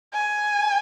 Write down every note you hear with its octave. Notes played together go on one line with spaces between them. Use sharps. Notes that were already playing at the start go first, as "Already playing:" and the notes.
G#5